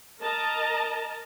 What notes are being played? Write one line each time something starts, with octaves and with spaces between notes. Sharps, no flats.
A#4 D#5 A5 A#5